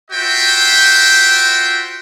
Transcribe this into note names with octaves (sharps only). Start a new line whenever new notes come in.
F4 F#4 C5 E5 G5